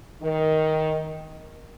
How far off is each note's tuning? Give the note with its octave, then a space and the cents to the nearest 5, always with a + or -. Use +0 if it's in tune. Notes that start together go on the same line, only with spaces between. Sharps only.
D#3 +10